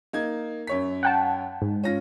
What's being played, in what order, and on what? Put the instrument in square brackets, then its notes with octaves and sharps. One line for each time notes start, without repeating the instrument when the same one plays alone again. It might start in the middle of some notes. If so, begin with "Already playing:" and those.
[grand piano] A#3 D#4 G#6
F#2 C#5 B6
[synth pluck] F#5 G5 A5
G#2
[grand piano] C#4 F4 A#6